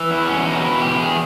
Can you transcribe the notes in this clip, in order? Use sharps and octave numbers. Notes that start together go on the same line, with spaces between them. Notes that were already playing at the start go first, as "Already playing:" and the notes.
Already playing: E3
E2 E4
C#4
B2 D#4
E4
E2 G4
G#4